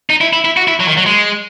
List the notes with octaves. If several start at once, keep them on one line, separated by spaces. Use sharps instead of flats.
D#4
E4
E4
E4
F#4
E4
F#3
D#3
F#3
G#3